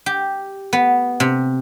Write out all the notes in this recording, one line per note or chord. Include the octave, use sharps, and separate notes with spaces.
G4
B3
C3